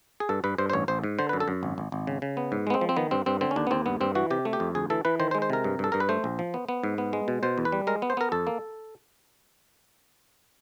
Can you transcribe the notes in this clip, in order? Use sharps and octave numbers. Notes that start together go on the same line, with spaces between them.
G#4
G2 A4
G2 B4
G2 C5
C5
A1 C#5
A1 C5
G#2
D3 C5
B4
F#2
A4
F#2
G#1
G#1
G#1
C#3
C#3
B3
G#2
G#3 B3
C4
F3
C4
D#3 B3
G2 C4
G2 C4
D3 C4
C#4
D#2 D4
B3
D#2 C4
G2 B3
G2 C4
E3 F#4
C3 G4
A3
G4
F2
D2 G#4
E3 A4
E3 B4
D#3 C5
C5
G#3
C5
C3 A#4
G2
G2 A4
G2 A#4
B4
A3 C5
A#1
F3
B3
B3
G#2
B3
G#3
B2
B2 C5
E2
B4
G3
G#3 A#4
B3
C5
B3 A#4
F2 A4
A#3